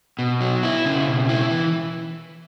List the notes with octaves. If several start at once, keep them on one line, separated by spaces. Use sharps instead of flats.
B2
F#3
E4
C#3
B2
E4
E3